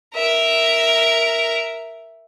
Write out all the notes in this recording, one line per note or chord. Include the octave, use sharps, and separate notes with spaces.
A#4 E5